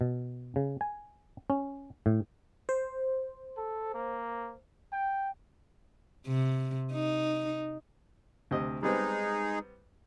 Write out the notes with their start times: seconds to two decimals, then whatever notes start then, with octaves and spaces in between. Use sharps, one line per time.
0.01 B2
0.56 C#3
0.81 G#5
1.50 C#4
2.06 A2
2.69 C5
3.57 A4
3.94 A#3
4.93 G5
6.27 C3
6.92 D#4
8.51 D2 C3 D#5
8.83 G3 G#3 B3 C4 D#4 G#4